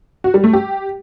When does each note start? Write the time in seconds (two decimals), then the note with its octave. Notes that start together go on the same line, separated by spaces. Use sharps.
0.24 F#4
0.34 G3
0.44 A3
0.53 G4